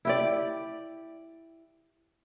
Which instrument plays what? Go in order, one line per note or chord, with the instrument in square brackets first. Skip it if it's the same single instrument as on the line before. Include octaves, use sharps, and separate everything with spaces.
[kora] E4 G4 D5